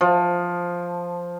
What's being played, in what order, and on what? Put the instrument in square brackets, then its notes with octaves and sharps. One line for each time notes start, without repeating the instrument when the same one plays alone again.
[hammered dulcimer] F3